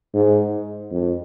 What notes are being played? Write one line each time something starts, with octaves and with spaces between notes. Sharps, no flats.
G#2
F2